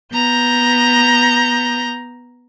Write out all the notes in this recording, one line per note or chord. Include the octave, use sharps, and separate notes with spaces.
B3 A#5 G6